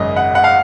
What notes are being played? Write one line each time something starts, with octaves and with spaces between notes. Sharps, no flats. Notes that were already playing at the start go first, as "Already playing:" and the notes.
Already playing: G#1 F#2 C#3 D#5
F#5
F#5
F5